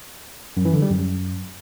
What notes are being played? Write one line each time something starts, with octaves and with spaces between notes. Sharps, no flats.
F#2
E3
D3
G3
F#2